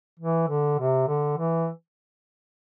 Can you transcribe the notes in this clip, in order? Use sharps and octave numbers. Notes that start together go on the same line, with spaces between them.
E3
D3
C3
D3
E3